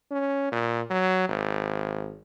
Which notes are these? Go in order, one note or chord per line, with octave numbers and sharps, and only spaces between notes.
C#4
A#2
F#3
G#1